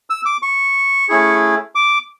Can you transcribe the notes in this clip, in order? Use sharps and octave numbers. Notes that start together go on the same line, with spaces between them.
E6
D6
C#6
A3 C#4 E4 G#4
D6